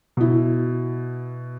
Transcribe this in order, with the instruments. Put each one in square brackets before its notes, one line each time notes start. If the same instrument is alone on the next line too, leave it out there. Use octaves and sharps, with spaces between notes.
[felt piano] B2 E4